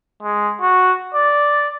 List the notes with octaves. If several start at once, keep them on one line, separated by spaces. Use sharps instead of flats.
G#3
F#4
D5